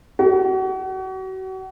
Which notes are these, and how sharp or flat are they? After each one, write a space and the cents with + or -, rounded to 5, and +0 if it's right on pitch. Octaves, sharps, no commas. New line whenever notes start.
F#4 +35